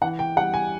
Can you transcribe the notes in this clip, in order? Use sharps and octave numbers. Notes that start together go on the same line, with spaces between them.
E3 F#5
G5
G3 F#5
G#5